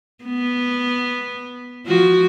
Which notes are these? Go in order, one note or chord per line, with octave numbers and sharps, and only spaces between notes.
B3
F3 F#4